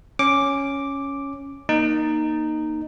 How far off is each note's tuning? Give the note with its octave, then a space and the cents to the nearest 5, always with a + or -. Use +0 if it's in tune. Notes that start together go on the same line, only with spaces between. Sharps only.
C#4 +0 D6 +0
A#3 +15 D#4 -10